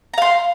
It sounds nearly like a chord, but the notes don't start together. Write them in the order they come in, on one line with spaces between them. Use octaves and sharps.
A#5 F5 C6